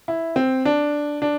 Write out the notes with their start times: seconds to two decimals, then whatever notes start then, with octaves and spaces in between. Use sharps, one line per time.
0.08 E4
0.36 C4
0.65 D4
1.22 D4